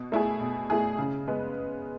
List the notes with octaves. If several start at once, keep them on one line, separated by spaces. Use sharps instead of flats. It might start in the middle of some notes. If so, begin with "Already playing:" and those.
Already playing: B2
A3 E4 G#4
B2
A3 E4 G#4
C#3
G#3 B3